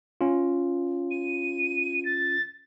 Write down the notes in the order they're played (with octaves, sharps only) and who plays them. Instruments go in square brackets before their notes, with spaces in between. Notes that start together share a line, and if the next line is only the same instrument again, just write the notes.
[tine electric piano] C#4 F4
[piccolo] D#7
A6